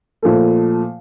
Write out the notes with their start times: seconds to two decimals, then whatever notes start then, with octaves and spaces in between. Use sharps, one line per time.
0.23 A#2 F3 A3